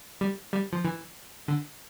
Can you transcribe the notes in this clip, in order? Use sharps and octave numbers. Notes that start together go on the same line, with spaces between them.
G3
G3
F3
E3
D3